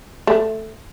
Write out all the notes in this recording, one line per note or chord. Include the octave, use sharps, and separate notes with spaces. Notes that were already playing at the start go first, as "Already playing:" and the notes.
A3